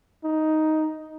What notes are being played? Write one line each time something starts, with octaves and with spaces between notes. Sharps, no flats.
D#4